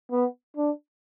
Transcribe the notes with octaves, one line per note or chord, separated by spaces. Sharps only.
B3
D4